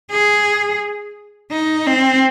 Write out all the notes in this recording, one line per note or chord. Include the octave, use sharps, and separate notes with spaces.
G#4
D#4
C4